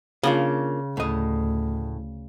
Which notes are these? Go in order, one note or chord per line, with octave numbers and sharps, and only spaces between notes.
C#3 A#3 D4 F4
D2 A2 D#5